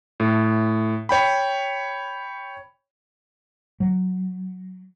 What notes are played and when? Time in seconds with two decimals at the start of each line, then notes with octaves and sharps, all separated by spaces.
0.20 A2
1.09 C#5 G5 B5
3.80 F#3